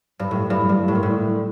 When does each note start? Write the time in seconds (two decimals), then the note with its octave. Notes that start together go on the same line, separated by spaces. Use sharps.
0.19 G2
0.31 A2
0.50 G2
0.69 G2
0.88 A2
0.95 A#2
1.03 A2